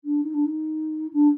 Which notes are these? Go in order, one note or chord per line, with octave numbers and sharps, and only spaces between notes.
D4
D#4
D4
D#4
D4